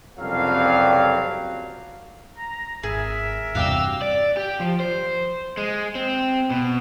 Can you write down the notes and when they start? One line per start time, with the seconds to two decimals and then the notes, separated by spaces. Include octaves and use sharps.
0.19 F#1 C2 F2 F#3 G3 F5
2.37 A#5
2.83 G#1 G#4 A#4 E5
3.55 E2 G2 C3 F#4 D5 F5 G5 E6
4.02 D5
4.37 G4
4.60 F3
4.80 C5
5.57 G#3
5.95 C4
6.50 B2